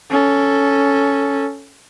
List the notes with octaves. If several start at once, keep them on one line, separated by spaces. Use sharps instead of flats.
C#4 A4